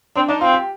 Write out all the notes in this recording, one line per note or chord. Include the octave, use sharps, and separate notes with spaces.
C4 D4
D4 D#4
C4 F4
G4